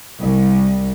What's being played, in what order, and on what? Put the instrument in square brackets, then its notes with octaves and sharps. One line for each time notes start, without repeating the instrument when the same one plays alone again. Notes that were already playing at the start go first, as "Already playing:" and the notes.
[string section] C2